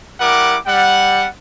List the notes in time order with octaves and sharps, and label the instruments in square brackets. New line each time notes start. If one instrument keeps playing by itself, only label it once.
[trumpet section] G3 E4 A#4 F#5 D6
G3 F#5